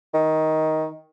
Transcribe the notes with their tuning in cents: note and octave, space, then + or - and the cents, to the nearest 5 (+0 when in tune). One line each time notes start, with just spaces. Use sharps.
D#3 +15